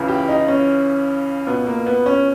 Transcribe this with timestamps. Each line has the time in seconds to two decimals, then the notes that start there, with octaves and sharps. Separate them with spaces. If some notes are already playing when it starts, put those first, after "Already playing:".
Already playing: C#2 C#3 E3
0.08 G4
0.28 D#4
0.48 C#4
1.47 C#2 B2 B3
1.67 A#3
1.86 B3
2.06 C#4